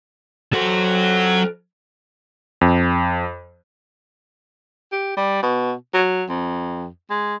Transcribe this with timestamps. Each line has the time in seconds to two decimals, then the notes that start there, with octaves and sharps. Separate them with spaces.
0.53 F#3 F#4 A4 C5
2.61 F2
4.92 G4
5.17 G3
5.43 B2
5.94 F#3
6.29 F2
7.11 G#3